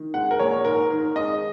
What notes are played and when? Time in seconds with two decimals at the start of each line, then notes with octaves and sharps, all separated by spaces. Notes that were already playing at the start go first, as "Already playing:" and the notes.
Already playing: D#3
0.14 G#3 F#5
0.31 A#4
0.39 A#1 C#5
0.65 G#2 A#4
0.90 D#3
1.16 G#3 D#5